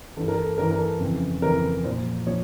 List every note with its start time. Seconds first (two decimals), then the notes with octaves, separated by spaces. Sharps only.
0.17 G2 E3 A4
0.28 A#4
0.38 A4
0.58 G2 E3 A#4
0.71 A#4
0.79 A4
1.00 F2 C#3 E3
1.42 F2 C#3 E3 A#4
1.84 A#2 F3 C5
2.26 F3 C#5